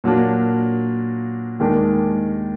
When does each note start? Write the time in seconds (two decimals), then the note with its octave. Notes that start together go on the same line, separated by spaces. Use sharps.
0.04 A#2 F#3 A#3 D4
1.59 D#2 D#3 G#3 D4